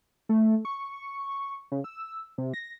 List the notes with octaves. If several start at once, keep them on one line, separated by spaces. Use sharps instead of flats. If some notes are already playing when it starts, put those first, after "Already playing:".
A3
C#6
C#3
E6
C3
A#6